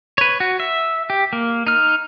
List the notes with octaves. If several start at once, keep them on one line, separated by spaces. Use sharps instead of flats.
B4 C#5
F#4
E5
G4
A#3
D#4 F6